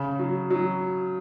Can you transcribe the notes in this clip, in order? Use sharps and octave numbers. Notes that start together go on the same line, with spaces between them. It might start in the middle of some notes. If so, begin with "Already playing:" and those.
Already playing: C#3
F#3
F#3